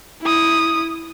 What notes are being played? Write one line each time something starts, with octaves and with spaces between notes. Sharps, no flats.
E4 D#6